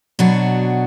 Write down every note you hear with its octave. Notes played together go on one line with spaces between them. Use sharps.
B2 F#3 D4 F#4